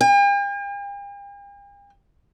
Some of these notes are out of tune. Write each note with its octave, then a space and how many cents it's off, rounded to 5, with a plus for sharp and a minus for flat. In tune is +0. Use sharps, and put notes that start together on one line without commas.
G5 +45